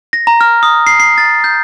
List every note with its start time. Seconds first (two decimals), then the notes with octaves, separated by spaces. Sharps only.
0.13 A#6
0.27 A#5
0.41 F6
0.63 D#6
0.87 C7
1.00 C7
1.18 A6
1.44 G6